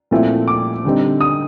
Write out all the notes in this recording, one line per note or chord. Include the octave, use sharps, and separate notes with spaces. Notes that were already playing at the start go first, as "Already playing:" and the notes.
A#2 F3 A3 C4 E4
D6
D3 G3 C4 D#4
D#6